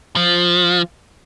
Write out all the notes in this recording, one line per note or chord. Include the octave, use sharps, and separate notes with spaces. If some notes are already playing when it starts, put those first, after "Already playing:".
F3